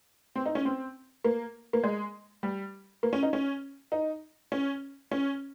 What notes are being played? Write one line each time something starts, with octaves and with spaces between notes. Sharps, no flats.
C4
D#4
C#4
C4
A#3
A#3
G#3
G3
A#3
C#4
D#4
C#4
D#4
C#4
C#4